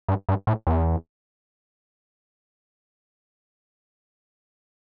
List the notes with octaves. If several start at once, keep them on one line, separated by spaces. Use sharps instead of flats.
G2
G2
A2
E2